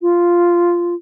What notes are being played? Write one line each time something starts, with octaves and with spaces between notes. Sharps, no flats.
F4